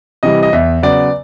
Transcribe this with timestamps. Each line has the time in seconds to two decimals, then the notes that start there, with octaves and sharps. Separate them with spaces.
0.23 C3 E3 G3 D#5
0.43 D#5
0.53 E2 E5
0.83 C#3 F#3 B3 D5